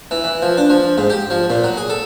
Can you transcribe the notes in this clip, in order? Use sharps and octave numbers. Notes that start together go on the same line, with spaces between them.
E3
E3
F3
D4
F3
G#2
G4
F3
A#2
F#3
G#4
A4